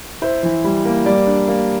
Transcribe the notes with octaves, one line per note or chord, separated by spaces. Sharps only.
E4 C5
E3
G3
A#3
G3 D5
D4
A#3